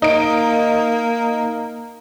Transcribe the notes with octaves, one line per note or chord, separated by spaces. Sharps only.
A#3 D#4 D7